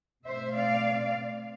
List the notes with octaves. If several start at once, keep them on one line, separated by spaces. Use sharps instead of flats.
B2 A3 C4 C5 E5
D5 F5